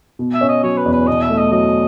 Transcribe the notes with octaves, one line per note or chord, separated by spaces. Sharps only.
B2
E5
C#4
D#5
F#3 C#5
B4
E2
B4
B2 D#5
E5
A3
D#5
F#3 D#5